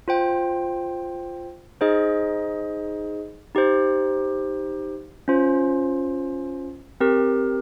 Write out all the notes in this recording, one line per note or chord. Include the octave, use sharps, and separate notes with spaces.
F4 C5 G5
D#4 G#4 C5 D#5
D#4 G4 C5
C#4 F4 C5
C4 G4 A#4